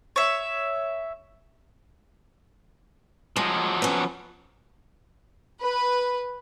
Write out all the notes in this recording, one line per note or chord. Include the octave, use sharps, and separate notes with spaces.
C#5 E5
F3 F#3 G#3
B3 C#4
B4